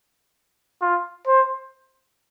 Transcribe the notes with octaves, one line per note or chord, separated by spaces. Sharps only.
F4
C5